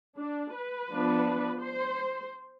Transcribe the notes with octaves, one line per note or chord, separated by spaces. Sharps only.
D4
B4
F3 B3 D4
C5